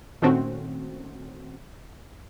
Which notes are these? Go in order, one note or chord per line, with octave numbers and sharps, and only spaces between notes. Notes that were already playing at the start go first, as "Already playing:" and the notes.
A#2 D#3 A3 C4 C#4 F#4